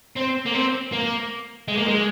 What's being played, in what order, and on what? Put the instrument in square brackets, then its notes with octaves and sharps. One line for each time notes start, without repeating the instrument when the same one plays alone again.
[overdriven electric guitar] C4
A#3
C4
A#3
G#3
A#3
G#3